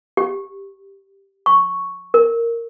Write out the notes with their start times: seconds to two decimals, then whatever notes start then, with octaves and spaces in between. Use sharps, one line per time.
0.17 G4
1.46 C#6
2.14 A#4